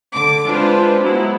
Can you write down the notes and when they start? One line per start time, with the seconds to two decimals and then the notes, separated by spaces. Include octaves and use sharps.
0.15 D3 D6
0.48 G#3 C4 D4 F4 B4 C5
1.03 F#3 G#3 B3 E4